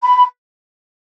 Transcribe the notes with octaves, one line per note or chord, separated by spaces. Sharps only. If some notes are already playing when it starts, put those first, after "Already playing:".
B5